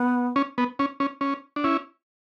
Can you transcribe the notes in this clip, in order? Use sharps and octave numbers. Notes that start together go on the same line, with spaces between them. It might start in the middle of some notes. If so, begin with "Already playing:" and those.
Already playing: B3
C#4
B3
C#4
C#4
C#4
D4
C#4 E4